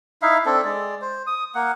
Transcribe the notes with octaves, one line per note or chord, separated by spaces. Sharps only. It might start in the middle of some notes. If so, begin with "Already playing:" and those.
D#4 E4 E5 F5
C4 D4 A4
G#3 D5
C5
D#6
A#3 F#5